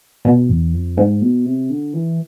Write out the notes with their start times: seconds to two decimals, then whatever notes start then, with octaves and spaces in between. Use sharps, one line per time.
0.25 B2
0.49 E2
0.73 F2
0.97 G#2
1.22 B2
1.45 C3
1.70 D3
1.94 E3